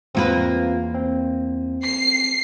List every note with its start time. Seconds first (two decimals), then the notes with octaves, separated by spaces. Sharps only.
0.15 E2 A#3 C4 F4 B4
0.94 C4
1.84 C7